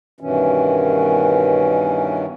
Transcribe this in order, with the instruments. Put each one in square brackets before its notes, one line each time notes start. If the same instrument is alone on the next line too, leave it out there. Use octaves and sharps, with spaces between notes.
[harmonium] G2 B2 D#3 E3 C#4